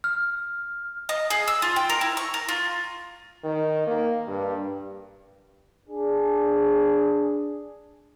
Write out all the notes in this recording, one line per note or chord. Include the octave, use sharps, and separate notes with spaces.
F6
D#5
G#4
E6
F4
G5
A#4
E4
C#6
A#4
F4
D#3
A#3
G2
D4 G#4